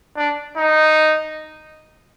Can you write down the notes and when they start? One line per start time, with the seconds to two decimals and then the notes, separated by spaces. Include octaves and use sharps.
0.17 D4
0.57 D#4